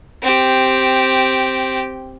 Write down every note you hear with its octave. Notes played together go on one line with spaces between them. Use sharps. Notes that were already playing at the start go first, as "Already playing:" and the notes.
C4 G4